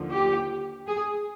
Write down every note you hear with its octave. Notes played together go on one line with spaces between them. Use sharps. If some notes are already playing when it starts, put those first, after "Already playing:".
Already playing: D#2 D3 F3
G4
G#4